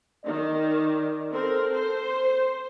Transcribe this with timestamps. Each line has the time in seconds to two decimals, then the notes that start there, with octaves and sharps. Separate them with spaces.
0.25 D#3 D5
1.32 C4 A4 A#4
1.74 C5